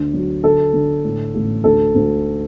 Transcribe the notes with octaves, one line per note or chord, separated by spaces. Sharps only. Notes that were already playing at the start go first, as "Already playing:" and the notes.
Already playing: D2 D3
F#3
D3 A4
D3
A2
A1
D2 A4
D2